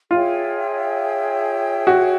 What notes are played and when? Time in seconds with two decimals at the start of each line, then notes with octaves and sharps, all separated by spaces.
0.11 F4 G#4 C#5 E5 G5
1.87 F#4